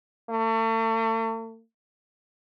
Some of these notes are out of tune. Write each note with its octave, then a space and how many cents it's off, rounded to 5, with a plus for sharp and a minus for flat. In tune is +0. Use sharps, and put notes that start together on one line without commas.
A3 +40